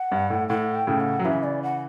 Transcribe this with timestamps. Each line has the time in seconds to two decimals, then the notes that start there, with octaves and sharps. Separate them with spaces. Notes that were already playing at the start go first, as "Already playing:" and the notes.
Already playing: F#5
0.12 G2
0.30 A2
0.49 A2 F#5
0.75 G5
0.87 A2 C#3
1.00 F#5
1.19 F#3
1.25 C#3 E3 E5
1.43 D5
1.63 F#5